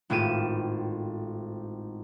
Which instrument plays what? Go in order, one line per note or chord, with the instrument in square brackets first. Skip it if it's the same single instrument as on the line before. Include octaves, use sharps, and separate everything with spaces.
[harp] G#1 A2 F4 G4 D#7 E7